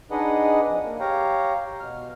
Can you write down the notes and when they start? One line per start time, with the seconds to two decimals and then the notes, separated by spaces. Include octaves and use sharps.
0.11 D4 D#4 G#4 B4 D#5 F#5
0.65 F2
0.84 A#3
1.00 G4 C#5 F5 G5 A#5
1.80 B2 F6